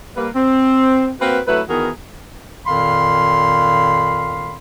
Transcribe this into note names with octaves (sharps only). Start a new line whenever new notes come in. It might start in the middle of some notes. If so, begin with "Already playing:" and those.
G3 A#3 B4
C4
A#3 C4 F#4 B4
C3 F#3 A3 E4 B4
D#3 E3 B3 F#4 G#4 A#4
F2 A#2 D#3 F5 B5 C6